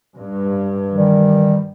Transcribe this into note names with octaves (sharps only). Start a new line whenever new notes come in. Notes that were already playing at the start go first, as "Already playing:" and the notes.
G2
D#3 E3 G3